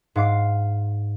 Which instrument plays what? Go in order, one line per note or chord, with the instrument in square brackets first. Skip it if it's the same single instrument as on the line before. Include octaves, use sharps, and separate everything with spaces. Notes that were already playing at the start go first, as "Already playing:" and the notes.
[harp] G#2 F5 D6 C7